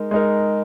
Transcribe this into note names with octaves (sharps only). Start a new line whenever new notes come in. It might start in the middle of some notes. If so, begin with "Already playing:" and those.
Already playing: G#3 D#4 A#4
G#3 D#4 A#4